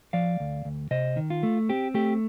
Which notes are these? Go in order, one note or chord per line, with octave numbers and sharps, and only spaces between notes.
F3 D5 F5
D2
D2
C3 C5 D#5
D#3
F4
A3
C4 G4
A3 G4